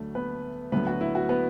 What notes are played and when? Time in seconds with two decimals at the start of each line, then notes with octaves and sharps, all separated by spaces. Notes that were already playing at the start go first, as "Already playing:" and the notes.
Already playing: D2 D3 F#3 A3
0.15 B3 B4
0.72 D2 D3 F#3 B3 B4
0.87 F#4
1.01 E4
1.15 F#4
1.29 B3 B4